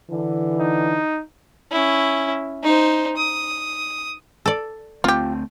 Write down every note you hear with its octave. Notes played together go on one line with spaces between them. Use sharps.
D3 E3
D#4
C#4 E4
D#4 C5
D#6
A4 D5
D2 A3 C4 F4 G4